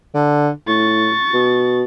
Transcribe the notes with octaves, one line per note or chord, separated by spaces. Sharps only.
D3
A2 C#6 A6
B2